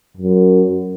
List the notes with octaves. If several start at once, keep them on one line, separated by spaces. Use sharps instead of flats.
F#2